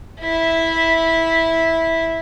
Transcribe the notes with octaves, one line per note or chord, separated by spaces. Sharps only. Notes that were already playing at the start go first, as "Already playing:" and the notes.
E4 E5